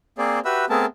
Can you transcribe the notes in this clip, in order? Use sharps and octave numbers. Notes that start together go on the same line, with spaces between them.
A#3 C4 G#4 C5 D5
F#4 G4 B4 E5 B5 E6
A3 B3 C4 G#4 A#4 A5